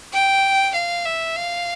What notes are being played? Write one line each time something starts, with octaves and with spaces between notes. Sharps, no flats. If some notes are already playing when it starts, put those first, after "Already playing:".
G5
F5
E5
F5